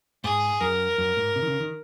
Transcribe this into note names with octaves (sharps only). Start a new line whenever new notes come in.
G#2 G#4
F#2 A#4
F#2
G#2
C3
D#3
C#3
D#3